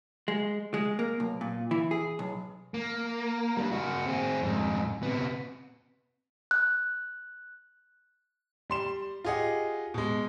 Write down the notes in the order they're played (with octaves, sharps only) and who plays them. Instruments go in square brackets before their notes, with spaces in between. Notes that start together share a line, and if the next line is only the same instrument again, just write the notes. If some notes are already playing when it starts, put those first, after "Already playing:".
[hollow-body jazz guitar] G#3
G#3
A#3
B1
A#2
E3
G#4
B1
[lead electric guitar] A#3
G3 D4
A#3 F#4
C4 G#4
F2 G#2
C3 B3
[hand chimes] F#6
[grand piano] G3 C6 E7
F4 G4 G#4 D#5 F#5
B2 G#3